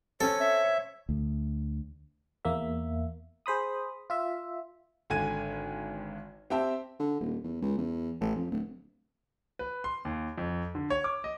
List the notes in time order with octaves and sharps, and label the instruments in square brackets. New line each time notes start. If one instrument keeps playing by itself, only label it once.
[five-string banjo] C4 C#4 [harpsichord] A4 [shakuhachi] C#5
[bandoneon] E5
[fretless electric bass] D2
[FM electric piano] E2 A#3 E5
G#4 C5 B5 D#6
F4 E5
[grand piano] G#1 D3 G#5 G#6 D#7
C4 G4 E5 G5 A5
[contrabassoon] D3
D#1
E2
C#2
E2
A1
F2
D1
[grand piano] B4
C6
D#2
F2
D3
C#5
D6
D#5